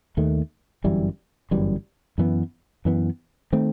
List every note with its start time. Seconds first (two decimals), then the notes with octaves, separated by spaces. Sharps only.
0.17 D#2 D#3 A3
0.84 G1 F#2 E3 G3
1.51 G1 F#2 E3 G3
2.18 F#2 E3 B3
2.85 F#2 E3 B3
3.52 D#3 A3 C4